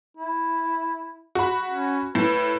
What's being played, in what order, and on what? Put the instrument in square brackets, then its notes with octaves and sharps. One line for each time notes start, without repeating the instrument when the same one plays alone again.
[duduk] E4
[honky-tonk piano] F#4 B5
[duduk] C#4
[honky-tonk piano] A2 [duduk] B4